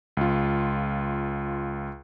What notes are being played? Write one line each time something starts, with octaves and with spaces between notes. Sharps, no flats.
C#2 F4